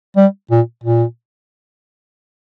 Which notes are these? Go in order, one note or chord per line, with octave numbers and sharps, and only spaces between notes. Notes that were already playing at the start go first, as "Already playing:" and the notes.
G3
A#2
A#2